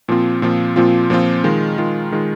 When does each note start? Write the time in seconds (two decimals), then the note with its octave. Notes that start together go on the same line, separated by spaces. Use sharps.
0.08 A#2 F3 C4 F4
0.42 A#2 F3 C4 F4
0.76 A#2 F3 C4 F4
1.10 A#2 F3 C4 F4
1.44 D#3 G#3 F4
1.78 D#3 G#3 F4
2.12 D#3 G#3 F4